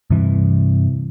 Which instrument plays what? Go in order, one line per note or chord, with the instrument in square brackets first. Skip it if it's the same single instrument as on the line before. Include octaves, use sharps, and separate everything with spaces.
[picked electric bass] G2 C3 E3